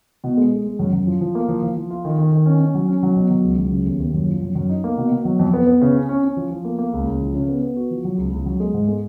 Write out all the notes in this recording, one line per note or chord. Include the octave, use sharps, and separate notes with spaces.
B2
G#3
G#3
G#3
F#2
F#2
F3
F3
A#3
F3
F3
F3
F4
D#3
D#3
D#3
C#4
C#4
F#3
C#4
F#3
B2
F#3
C#2
F#3
C#3
D#2
D#2
F#2
F3
F#2
F#2
D#4
A#3
B2
B2
F#3
F2
B3
B3
C#3
C#4
C#4
C#4
F3
F3
A#3
A#3
C#2
C#2
F3
C#3
B3
B3
F#4
F3
F#3
C#2
C#2
F#3
G#3
G#2
G#3